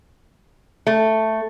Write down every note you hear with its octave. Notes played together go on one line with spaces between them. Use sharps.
A3